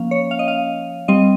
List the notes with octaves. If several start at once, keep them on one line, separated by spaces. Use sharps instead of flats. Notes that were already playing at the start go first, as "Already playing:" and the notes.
Already playing: F3 A#3 C#4 F5
C#5
F5
D#5
F5
G3 C4 D#5